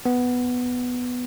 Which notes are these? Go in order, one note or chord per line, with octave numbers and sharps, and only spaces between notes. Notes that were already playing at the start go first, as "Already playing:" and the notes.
B3